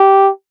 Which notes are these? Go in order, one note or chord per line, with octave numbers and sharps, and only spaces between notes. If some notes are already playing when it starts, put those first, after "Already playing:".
Already playing: G4